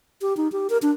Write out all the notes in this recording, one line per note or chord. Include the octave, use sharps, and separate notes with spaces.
G4
D#4
G4
A#4
D4